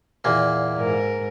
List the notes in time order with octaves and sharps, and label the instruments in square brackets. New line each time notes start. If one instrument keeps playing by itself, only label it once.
[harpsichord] E2 A#2 A#3
[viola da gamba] G#2 A#4